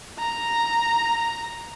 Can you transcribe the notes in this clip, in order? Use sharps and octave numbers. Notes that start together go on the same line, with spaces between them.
A#5